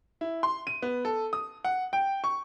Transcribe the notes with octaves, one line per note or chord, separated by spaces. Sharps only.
E4
C6
D#7
B3
A4
D#6
F#5
G5
C#6